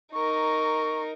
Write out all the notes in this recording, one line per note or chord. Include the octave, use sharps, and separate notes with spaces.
D#4 A#4 C#6